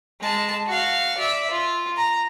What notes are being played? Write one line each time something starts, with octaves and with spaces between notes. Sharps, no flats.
G#3 A5
F#4 F5
D5 E5
F4
A#5